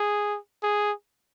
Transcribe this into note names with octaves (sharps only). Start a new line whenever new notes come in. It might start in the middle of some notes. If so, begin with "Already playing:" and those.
Already playing: G#4
G#4